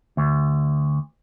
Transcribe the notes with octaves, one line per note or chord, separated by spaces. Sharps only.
D2